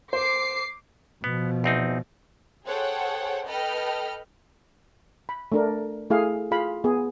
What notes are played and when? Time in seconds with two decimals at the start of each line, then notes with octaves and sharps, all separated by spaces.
0.13 C5 D6 C7
1.24 B2 F3 B3
1.64 E2 C4 D#4
2.66 G#4 A4 C5 C#5 F#5 G5
3.47 A4 B4 D#5 G5 B5 F6
5.29 B5
5.52 A3 D4 A#4
6.10 A3 E4 G#4 F5
6.51 F4 G#4 F5 B5
6.84 B3 G#4